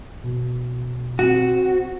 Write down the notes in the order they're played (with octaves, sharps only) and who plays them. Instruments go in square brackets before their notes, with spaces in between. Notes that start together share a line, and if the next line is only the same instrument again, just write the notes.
[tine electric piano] B2
[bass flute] C4 [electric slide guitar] F#4